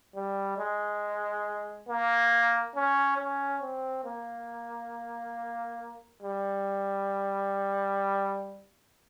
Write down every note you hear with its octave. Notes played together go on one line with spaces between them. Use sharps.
G3
G#3
A#3
C#4
C#4
C4
A#3
G3